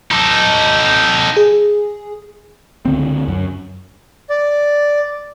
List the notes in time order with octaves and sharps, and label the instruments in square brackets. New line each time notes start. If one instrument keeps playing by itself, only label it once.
[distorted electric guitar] D#4 A4
[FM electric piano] G#4
[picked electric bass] C#2 D3 C4
F#2
[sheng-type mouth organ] D5